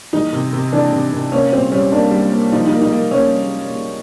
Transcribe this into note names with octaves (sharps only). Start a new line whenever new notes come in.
E3 D#4
C3
C3
E3 D4
C3
C3
A#3 C#4
A#2 C4
G3 C#4
A#3 D4
G3
A#3
F3 D#4
D#4
A#3
D#4
A#3
A#3 C#4